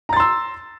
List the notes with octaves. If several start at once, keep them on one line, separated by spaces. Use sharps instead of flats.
A#5 C6 E6 A6